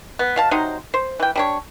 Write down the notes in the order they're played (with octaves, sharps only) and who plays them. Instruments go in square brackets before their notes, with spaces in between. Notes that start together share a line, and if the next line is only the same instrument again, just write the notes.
[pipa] B3
B2 F5 A5
C3 F#3 D#4 C5
C5
E3 G5
G3 D4 C#5